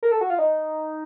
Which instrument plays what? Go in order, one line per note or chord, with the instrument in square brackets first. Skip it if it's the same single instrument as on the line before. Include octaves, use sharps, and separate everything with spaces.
[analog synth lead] A#4
A4
F#4
F4
D#4